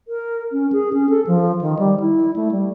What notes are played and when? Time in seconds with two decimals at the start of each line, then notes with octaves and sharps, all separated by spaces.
0.08 A#4
0.52 C#4
0.72 G#4
0.93 C#4
1.09 A4
1.27 F3
1.61 D#3
1.79 G3
2.00 E4
2.36 A3
2.51 G3